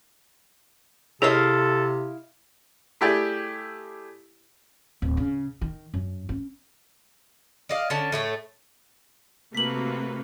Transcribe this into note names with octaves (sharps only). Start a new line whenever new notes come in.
C3 E4 G#4 A4 C#5 D#5 F5
A3 E4 G4 G#4 D5 G5
D1
C#3
D#3
F#2
C#4
D5 D#5 F5
D3 C#4 A5
A2 A3 C#5
C3 A3 A#3 F#4 B4 B6 F#7